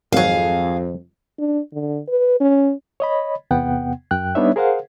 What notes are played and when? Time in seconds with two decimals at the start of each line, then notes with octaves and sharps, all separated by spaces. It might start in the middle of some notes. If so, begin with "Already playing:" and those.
0.12 G#1 F2 F#3 G#4 F5
1.39 D4
1.73 D3
2.08 B4
2.41 C#4
3.00 C#5 D#5 B5
3.51 E2 C3 B3 F#5 G5
4.11 F#2 G5 F#6
4.35 G3 B3 D4 D#4 C#5 E5
4.56 G#4 A#4 C5 F5 F#5